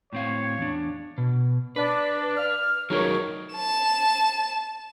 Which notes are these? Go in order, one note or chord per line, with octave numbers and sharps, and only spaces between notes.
A2 C4 C#5 F5
E2 D4
B2
D4 B4
F6
C#2 F#3 D#4 A#4 C#5
A5 E7